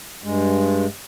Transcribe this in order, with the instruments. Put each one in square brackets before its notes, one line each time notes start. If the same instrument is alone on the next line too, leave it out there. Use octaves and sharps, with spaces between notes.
[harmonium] G2 G#3